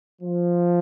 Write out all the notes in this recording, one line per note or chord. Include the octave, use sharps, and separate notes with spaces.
F3